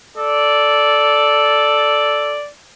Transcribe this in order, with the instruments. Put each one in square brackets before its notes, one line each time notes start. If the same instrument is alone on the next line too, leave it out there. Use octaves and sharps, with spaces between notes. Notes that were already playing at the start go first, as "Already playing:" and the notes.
[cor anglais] A4 [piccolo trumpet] D5